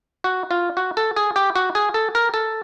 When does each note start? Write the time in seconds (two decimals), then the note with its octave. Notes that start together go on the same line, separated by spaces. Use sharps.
0.24 F#4
0.51 F4
0.77 F#4
0.97 A4
1.16 G#4
1.36 G4
1.56 F#4
1.75 G#4
1.94 A4
2.15 A#4
2.34 A4